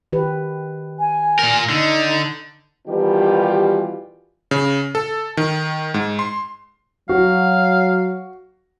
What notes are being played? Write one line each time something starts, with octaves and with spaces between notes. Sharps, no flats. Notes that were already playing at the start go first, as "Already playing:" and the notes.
D#3 G4 B4
G#5
A#2 A#4
D3 D#4
B2 D#3 E3 G3 F4 G4
C#3
A4
D#3
G#2
C6
F#3 F#4 F5